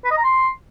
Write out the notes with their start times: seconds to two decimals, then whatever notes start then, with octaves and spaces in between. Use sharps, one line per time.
0.05 B4
0.11 D#5
0.18 A#5
0.24 C6